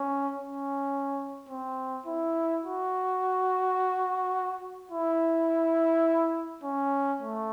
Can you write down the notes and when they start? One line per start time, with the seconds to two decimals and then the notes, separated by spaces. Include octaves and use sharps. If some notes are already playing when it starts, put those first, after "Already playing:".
Already playing: C#4
0.35 C#4
1.49 C4
2.06 E4
2.64 F#4
4.92 E4
6.63 C#4
7.21 A3